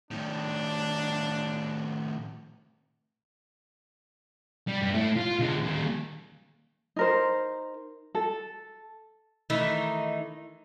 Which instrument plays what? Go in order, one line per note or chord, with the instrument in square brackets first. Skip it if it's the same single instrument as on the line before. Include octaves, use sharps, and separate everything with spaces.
[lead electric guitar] A2 D#3 [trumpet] D4
[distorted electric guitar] G3
G2 D4
A3 E4
F4
D3 G#3
A#2 D#3
[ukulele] D#4 A#4 C5
A4
[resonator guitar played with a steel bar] D#3 E3 A3 D#4